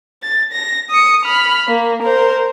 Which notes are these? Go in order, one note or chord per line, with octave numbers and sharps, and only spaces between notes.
A6
A#6
D#6 C#7
B5 F6
A#3
A#4 C5